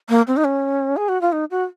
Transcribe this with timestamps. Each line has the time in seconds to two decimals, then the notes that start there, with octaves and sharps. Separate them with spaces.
0.09 A#3
0.27 C4
0.37 D#4
0.44 C#4
0.97 G#4
1.09 F#4
1.21 F4
1.32 D#4
1.51 F#4